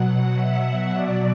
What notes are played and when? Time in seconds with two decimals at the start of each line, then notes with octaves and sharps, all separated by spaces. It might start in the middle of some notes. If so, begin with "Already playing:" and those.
Already playing: B2 F#3 F#5
0.35 E5
0.94 B2 F#3 D5